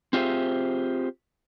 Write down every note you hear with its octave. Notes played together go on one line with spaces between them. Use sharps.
C4 F4 G4 G#4 C5 E5